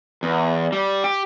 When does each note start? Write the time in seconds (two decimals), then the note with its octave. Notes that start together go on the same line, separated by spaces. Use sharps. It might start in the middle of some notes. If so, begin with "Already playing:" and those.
0.23 E2
0.73 G3
1.04 G4